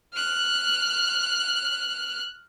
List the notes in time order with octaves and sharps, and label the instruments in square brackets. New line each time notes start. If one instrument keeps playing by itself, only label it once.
[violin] F6 F#6